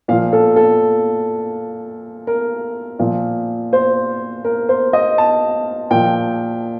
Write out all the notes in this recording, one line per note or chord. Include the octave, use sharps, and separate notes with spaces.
A#2 F3 F5
A4
A4
A#4
A#2 F3
C5
A#4
C5
D#5
A5
A#2 F3 G5